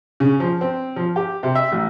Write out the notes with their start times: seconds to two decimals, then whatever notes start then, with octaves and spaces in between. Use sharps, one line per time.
0.20 C#3
0.40 F3
0.61 C4
0.96 F3
1.16 G4
1.43 C3
1.55 E5
1.72 A1